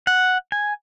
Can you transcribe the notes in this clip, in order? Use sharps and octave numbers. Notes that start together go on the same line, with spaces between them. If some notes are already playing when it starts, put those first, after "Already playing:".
F#5
G#5